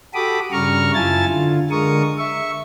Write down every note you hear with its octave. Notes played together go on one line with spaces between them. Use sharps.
F#4 G4 A4 B5 D6 D#6
G2 C#3 G3 A#5 C#6 F6
F#2 E4 F4 G#5 A5 A6
D3 F4
D3 G#3 A#4 C#6 D#6
E5 C#6